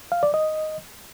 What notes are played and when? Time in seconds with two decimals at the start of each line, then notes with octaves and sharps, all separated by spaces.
0.12 F5
0.23 D5
0.34 D#5